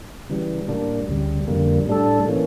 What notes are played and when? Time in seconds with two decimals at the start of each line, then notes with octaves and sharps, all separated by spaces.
0.30 C#3 E3 G3
0.68 A2 G3 A#3 D4
1.08 D2 C#3 G3
1.48 F2 D3 G3 A#3
1.88 A2 G3 D4 A4
2.29 E3 A#3 C#4